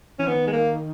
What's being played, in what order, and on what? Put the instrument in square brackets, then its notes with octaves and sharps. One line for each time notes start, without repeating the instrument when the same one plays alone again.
[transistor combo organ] E3 [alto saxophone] C#4
[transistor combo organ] D#3 [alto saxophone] B3
[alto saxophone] G#3
A#3